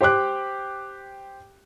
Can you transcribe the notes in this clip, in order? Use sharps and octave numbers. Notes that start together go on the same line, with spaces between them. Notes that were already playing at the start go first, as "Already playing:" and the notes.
G4 C5 G5 D6 F#6